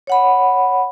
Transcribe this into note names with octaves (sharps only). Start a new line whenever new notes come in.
C#5 F#5 B5